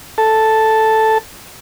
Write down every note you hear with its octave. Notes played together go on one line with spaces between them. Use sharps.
A4 A5